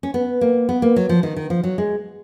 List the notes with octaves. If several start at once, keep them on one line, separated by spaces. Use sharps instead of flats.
C#4
B3
A#3
B3
A#3
F#3
F3
D#3
D#3
F3
F#3
G#3